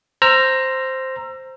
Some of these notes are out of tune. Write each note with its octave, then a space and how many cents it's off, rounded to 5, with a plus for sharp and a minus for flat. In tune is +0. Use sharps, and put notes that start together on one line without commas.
C5 +0 A#5 +0 E6 +35